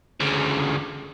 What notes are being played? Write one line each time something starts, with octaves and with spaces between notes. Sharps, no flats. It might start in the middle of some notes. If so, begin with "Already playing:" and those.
D2 C#3